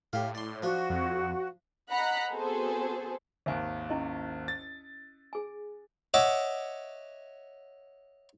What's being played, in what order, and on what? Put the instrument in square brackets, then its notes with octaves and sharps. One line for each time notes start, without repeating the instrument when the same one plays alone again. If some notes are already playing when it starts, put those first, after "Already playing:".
[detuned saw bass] A2 [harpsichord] G4 F5
[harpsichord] D5 C6
[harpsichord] F3 D4 [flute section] F#4
[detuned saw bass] F2
[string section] D#5 F#5 A#5 B5 F#6 B6
B3 C4 F#4 G#4 A4 C5
[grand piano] G#1 D#2 [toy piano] E5 G#5
[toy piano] C#4 E4 D#5
[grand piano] A6
[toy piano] G#4 G#5
[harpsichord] C#5 D#5 E5 F#5 D6